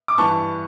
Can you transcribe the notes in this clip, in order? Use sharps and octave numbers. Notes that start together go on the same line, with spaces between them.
D6
G2 E3 B3 A5 C#6